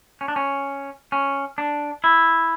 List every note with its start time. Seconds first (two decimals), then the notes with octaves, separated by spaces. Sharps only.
0.21 C#4
0.28 D4
0.36 C#4
1.12 C#4
1.58 D4
2.04 E4